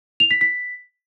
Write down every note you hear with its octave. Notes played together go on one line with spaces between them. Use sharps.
F7
B6
B6